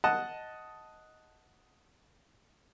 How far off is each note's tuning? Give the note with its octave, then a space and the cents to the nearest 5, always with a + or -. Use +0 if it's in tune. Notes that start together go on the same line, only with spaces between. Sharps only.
D#5 +5 F#5 +0 A5 +0